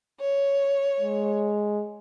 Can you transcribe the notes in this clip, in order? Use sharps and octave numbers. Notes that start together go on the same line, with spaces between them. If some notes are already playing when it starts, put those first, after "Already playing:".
C#5
G#3